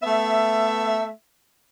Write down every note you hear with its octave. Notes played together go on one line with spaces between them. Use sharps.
A3 B3 E5